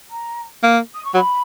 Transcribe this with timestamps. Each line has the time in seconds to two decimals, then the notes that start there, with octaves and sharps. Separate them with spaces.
0.10 A#5
0.63 A#3
0.95 D#6
1.05 C#6
1.14 F#3 B5